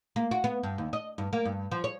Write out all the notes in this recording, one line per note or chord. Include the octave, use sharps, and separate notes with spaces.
A#3
F#4
B3
G2
D#2
D#5
G2
A#3
G2
F3
C#5